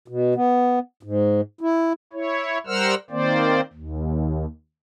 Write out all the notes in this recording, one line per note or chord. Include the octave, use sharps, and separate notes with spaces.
B2
B3
G#2
E4
E4 C#5
G3 A#4 C5 F#5 E6 F6
D#3 A#3 C4 C5 D5
D#2